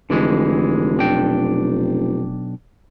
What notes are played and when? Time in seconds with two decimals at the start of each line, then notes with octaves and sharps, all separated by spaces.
0.10 F1 D3 E3 G#3
0.97 B1 D4 G5